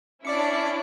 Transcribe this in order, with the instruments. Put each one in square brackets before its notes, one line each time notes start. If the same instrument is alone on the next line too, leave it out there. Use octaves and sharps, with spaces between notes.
[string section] C#4 D4 E4 [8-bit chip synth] D5 D6 C#7